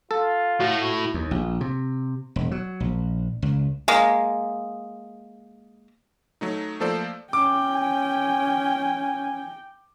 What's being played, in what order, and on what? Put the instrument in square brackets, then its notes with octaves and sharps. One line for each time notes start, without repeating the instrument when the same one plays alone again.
[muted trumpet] F4 [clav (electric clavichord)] A4
[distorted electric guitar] A2 [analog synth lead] F#4
[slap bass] D#2
A#1
C3
E1
F#3
A#1
C#2
[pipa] G#3 A#3
[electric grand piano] F#3 A3 D#4
F3 A3 A#3 A4 C5 D5
[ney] C#4 [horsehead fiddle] G5 [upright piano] D6
[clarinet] G#5